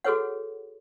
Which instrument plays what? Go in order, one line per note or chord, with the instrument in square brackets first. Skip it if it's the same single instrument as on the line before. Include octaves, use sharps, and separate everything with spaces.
[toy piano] F#4 G#4 A4 B4 C#5 F#5